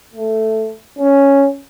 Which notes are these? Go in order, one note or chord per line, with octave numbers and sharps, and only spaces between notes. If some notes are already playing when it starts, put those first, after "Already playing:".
A3
C#4